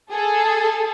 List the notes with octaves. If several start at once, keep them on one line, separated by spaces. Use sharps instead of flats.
G#4 A4